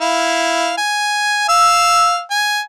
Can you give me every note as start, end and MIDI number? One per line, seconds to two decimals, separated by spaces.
0.01 0.75 64
0.01 0.75 77
0.78 1.47 80
1.49 2.22 77
1.49 2.22 88
2.31 2.61 80